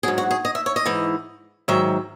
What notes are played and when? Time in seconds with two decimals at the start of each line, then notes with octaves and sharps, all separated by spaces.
0.03 G#2 F#3 G#4
0.18 F#4
0.31 G#4
0.45 D#5
0.55 E5
0.66 C#5
0.76 D#5
0.86 G#2 E3
1.68 G#2 D#3 F#3 E5